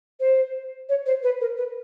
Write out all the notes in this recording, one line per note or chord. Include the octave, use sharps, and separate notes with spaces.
C5
C#5
C5
B4
A#4
B4